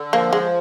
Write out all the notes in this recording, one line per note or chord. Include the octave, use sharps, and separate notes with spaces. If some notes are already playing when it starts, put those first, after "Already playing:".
Already playing: D3
F3 A#3
G#3